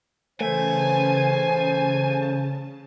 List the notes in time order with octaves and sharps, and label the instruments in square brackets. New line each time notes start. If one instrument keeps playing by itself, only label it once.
[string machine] C#3 A5 [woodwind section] E3 C5 [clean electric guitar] A3 [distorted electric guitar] G#5